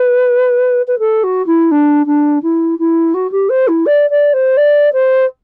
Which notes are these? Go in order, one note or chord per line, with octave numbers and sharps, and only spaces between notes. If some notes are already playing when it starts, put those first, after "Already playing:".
Already playing: B4
B4
A4
F#4
E4
D4
D4
E4
E4
F#4
G4
C5
E4
D5
D5
C5
D5
C5